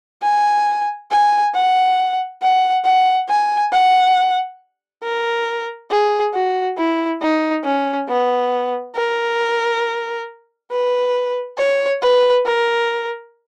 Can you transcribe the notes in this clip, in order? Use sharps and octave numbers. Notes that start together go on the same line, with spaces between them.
G#5
G#5
F#5
F#5
F#5
G#5
F#5
A#4
G#4
F#4
E4
D#4
C#4
B3
A#4
B4
C#5
B4
A#4